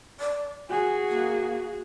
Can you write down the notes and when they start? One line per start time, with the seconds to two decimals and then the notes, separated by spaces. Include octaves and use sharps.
0.20 D5
0.69 F#4 G#4 G#5
1.09 A#3